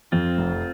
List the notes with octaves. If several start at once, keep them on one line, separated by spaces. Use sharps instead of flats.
F2 C4 F4
F1